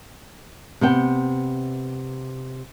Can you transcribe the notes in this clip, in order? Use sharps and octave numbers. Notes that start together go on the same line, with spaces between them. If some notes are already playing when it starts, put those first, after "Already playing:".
C3 B3 G5